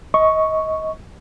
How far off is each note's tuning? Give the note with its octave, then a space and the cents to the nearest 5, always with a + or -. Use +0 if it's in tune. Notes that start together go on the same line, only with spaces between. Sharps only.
D#5 +25 C#6 +0